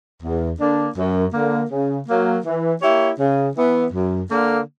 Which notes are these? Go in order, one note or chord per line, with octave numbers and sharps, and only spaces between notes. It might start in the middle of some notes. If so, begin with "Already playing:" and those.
E2
D3 A#3 D4
F#2
D3 A#3
C#3
F#3 A#3
E3
A#3 E4 G4 C#5
C#3
E3 B3
F#2
D3 A#3